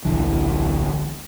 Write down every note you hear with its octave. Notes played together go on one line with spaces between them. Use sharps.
D1 A#1 D3 E3